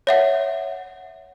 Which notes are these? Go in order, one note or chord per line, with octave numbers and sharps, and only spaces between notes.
C#5 E5 F#5